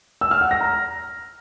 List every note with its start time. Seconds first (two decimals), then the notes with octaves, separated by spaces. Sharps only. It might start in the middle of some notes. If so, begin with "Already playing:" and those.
0.21 E6
0.31 F6
0.41 F#5
0.51 A#6
0.61 A#5